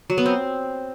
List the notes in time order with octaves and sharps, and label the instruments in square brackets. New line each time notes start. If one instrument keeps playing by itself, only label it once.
[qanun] F#3
B3
C4